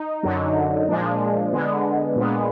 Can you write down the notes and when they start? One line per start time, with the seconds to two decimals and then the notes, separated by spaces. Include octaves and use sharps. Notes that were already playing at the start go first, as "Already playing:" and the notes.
Already playing: D#4
0.23 F#2 D3 F#3
0.88 A#2 F3 G#3 D4
1.53 D3 G#3 B3
2.16 A#2 G#3 B3